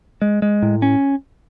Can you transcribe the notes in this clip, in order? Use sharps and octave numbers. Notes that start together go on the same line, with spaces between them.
G#3
G#3
A2
C#4